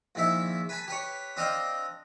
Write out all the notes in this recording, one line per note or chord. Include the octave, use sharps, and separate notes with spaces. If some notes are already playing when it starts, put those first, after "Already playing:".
A#1 D#3 E4 E5
B4 G#5 A5 B5
G4 B4 C#5
C4 D4 D#5 F5 G5